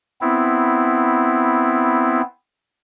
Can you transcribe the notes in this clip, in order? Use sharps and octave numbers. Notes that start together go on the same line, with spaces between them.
B3 C4 E4